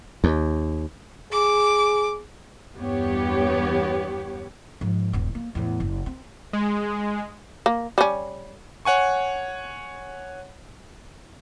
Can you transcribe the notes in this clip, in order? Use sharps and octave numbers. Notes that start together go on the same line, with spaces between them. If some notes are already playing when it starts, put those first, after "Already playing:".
D#2
G#4 D6
E2 G2 B3 G4 C#5
G#2 F3
D#1 G2
A#3
E2 A2
F#1
C4
G#3
A#3
G3 C#4
C#5 F#5 G#5 C#6